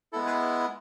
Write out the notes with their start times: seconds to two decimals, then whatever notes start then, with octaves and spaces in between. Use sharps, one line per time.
0.13 G#3 B3 E4 A4
0.26 G#4 B4